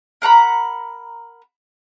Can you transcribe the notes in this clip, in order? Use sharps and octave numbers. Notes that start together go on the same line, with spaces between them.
A#4 F#5 A#5 B5